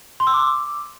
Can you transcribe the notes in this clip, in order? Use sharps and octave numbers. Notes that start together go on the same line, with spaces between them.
C6
E6
D6